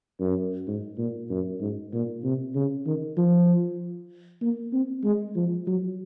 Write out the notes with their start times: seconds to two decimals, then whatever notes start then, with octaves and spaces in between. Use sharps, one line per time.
0.20 F#2
0.67 G#2
0.98 A#2
1.30 F#2
1.60 G#2
1.93 A#2
2.24 C3
2.55 C#3
2.86 D#3
3.17 F3
4.41 A#3
4.73 C4
5.04 G#3
5.36 F3
5.67 F#3